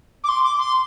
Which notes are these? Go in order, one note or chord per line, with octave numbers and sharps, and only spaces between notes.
D6
C6
D6
C6